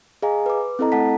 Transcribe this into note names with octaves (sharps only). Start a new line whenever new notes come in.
G#4 D#5 F5 G#5 A#5
B4 D6
C4 E4 A4 D#5 A#5
A3 A4 F#5 A5 B6